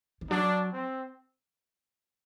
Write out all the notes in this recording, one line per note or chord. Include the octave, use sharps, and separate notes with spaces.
D#3
F#3 D4
C4